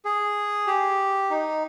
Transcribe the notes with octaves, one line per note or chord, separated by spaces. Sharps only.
G#4
G4
D#4